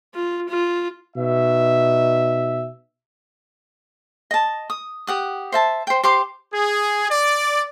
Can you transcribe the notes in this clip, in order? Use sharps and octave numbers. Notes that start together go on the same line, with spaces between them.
F4
F4
B2 D#4 E5
D#5 A5
D#6
G4 F#5 D#6
C5 E5 A5
C5 G5
G4 C5 C6 D6
G#4
D5